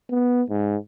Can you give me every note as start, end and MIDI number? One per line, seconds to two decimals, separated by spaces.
0.11 0.42 59
0.50 0.77 44